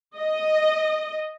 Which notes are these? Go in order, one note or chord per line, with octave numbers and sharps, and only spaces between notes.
D#5